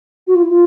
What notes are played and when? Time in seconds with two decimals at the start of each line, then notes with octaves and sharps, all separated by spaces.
0.27 F#4
0.35 F4
0.42 E4
0.49 F4